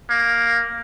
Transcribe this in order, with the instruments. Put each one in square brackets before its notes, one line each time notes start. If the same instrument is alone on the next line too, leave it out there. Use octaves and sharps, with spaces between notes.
[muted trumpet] A#3